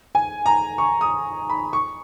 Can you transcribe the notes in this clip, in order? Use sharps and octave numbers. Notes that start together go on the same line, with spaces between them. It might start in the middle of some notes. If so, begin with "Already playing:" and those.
G#5
A#5
C#6
D#6
B5
C#6